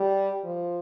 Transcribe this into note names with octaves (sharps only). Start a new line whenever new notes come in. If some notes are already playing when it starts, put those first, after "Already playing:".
Already playing: G3
F3